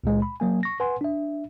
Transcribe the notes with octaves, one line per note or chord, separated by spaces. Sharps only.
C#2 A#2 G#3
B5
F#3 A#3 G#5
C#6 A#6
B4 F#5 G#5 C6
D4 E5